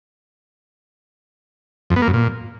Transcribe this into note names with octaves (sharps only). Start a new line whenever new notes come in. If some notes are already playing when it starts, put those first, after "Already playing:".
F2
B3
A#3
F#2
A#2